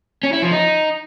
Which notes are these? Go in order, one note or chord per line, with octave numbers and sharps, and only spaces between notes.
C#4
E4
F3
D#4